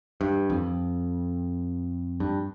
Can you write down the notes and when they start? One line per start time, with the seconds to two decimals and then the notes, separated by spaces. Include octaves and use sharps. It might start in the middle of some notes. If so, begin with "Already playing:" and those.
0.21 G2
0.50 F2
2.20 G2